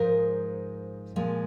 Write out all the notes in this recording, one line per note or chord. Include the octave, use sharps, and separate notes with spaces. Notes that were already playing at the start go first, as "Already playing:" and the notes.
Already playing: G#2 F3 G#3 A#4
A#2 F3 G#3